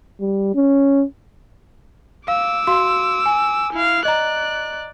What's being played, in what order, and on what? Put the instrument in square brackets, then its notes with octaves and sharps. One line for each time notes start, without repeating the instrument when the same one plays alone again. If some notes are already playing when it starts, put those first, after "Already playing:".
[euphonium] G3
C#4
[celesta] F5 [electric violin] D6 E6
[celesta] F#4 F5 C6
G#5
[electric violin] E4 F5
[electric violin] D5 F#6 [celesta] D#5 A#5